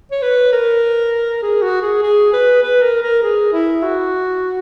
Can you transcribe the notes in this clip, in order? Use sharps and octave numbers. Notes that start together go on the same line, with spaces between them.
C#5
B4
A#4
G#4
F#4
G#4
G#4
B4
B4
A#4
A#4
G#4
E4
F#4